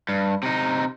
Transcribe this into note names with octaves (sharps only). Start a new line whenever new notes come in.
G2
C3 D#4